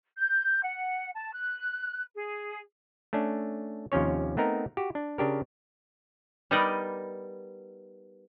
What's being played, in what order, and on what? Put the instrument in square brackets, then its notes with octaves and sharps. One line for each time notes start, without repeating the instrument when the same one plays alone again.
[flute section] G6
F#5
A5
F#6
G#4
[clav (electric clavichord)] A3 C#4 D4
D#2 C3 F3 C#4 C#5
A3 B3 C4 D#4 A#4
F#4 G4
D4
C#3 D4 G4 A#4
[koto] G3 B3 D#4 A#4 D5 D#5